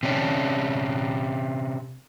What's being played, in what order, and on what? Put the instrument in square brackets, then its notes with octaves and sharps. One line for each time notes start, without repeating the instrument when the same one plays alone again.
[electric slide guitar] C3 C#4 D4